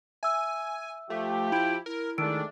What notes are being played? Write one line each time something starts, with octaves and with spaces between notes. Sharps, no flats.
E5 G#5 E6
F3 A3 F4 G4
E4 G5
E4 A#4
D#3 G#3 A3 D4 E6 D7